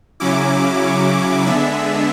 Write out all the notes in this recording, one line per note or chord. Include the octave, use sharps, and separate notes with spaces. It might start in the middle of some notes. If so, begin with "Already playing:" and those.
C#3 F#3 C#4 E4 D6
D3 G#3 B3 D4 E5